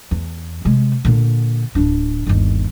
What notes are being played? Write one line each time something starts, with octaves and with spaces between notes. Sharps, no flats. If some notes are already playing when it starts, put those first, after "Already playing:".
E2
C3 G#3
A#2 D3
D1 D4
G1 D#2